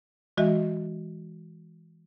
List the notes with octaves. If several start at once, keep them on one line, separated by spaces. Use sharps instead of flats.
E3 G#3 F#4 D#5 E5